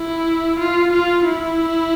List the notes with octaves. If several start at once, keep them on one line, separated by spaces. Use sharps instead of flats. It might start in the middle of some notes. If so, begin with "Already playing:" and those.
Already playing: E4
F4
F4
E4